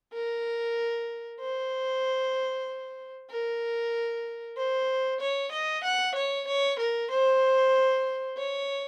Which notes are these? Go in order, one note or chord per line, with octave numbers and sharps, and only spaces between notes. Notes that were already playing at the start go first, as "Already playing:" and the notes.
A#4
C5
A#4
C5
C#5
D#5
F#5
C#5
C#5
A#4
C5
C#5